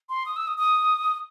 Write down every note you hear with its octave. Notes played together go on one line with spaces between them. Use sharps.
C6
D#6
E6
D#6
D#6